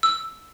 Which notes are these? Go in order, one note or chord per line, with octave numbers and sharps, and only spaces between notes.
E6